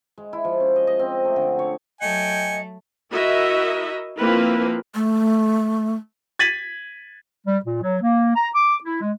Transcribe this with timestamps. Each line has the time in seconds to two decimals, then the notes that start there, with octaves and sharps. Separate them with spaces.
0.18 G#3
0.33 E4
0.45 F3
0.60 C#4
0.76 D#5
0.87 D#5
0.99 C4
1.25 A3
1.36 D3
1.59 C#5
2.01 F#3 A3 D#5 G5 G#5 C#7
3.11 E4 F#4 A#4 D#5 E5
4.16 F3 A#3 C4 E4 B4
4.95 A3
6.39 G#6 A6 B6 D#7 F#7
7.47 G3
7.64 A#2
7.82 F#3
8.02 A#3
8.35 A#5
8.55 D6
8.84 E4
9.01 G#3